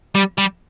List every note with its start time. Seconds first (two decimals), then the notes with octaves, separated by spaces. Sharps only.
0.15 G3
0.38 G3